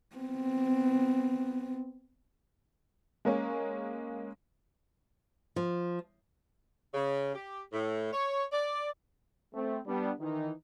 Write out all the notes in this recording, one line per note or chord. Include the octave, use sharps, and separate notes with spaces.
B3 C4
G#3 A#3 C#4
F3
C#3
G4
A2
C#5
D5
A3 C4
G3 B3 D4
D#3 E3 D#4